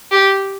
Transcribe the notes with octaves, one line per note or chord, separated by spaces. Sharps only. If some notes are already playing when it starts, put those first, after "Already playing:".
G4